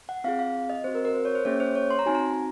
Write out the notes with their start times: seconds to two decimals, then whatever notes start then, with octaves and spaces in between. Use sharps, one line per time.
0.09 F#5
0.24 C4 F4 G#4 F5
0.39 F5
0.70 D#5
0.84 C4 F#4 C5
0.95 A#4
1.05 A#4
1.15 C5
1.25 C#5
1.35 C5
1.45 A#3 C#4 G#4 C#5
1.60 C5
1.75 C#5
1.91 C6
1.99 A#5
2.06 C4 D#4 F#4 G#5
2.15 A#5